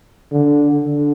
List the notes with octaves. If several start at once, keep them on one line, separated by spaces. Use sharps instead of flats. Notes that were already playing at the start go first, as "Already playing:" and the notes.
D3
D3